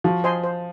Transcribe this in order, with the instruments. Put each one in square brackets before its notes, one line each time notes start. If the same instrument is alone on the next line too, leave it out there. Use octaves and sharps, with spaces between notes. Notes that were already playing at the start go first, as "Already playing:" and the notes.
[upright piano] F3 [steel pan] F#4
[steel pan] C5 D#5 G#5 C6
C5